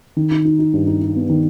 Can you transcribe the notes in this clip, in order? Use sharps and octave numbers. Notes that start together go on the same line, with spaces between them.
D#3
D#4
D#4
D#4
G2
D#4
D#4
B3
D#3